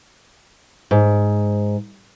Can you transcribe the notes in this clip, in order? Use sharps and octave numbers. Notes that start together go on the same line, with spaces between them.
G#2